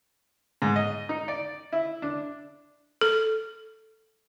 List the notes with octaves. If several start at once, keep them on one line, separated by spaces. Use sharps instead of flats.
G#2
D#5
D#4
D5
E4
D4
A4